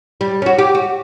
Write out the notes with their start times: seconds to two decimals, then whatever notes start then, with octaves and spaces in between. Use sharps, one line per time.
0.21 G3
0.42 C#4 F#4
0.58 G4
0.75 F#4